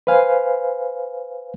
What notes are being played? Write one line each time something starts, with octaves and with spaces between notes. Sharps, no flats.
B4 C5 F5 G#5